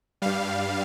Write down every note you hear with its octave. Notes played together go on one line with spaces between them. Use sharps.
G2 G3 F5